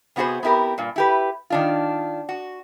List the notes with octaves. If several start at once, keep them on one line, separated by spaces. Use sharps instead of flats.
C3 B3 F#4 G#4 C5
B3 C4 E4 G4 A#4
G2 A#2
E4 G4 B4
D#3 D4 F4
F#4